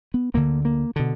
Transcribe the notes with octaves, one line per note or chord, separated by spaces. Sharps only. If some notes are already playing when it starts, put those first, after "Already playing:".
B3
D2 D3 A#3
A#3
B2 D3